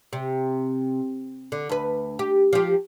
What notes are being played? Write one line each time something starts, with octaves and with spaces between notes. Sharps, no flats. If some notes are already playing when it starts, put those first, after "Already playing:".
C3
D3
D2 B4
G4
F3 G4